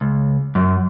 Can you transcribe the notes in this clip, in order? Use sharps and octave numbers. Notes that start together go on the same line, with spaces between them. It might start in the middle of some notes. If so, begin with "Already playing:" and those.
C#2
F#2